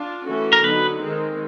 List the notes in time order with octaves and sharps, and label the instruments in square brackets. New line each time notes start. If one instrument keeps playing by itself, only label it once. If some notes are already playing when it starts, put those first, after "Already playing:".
Already playing: [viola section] D4 F4
E3 A3 C#4 F#4 A4
[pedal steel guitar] A#4
[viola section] D3 F#3 B3 D#4 [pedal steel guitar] B4
[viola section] D#3 G#3 C4